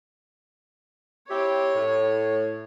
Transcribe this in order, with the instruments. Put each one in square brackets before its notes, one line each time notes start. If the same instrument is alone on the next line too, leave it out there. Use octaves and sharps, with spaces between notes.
[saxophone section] C4 E4 G4 [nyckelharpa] C#5
[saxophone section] A2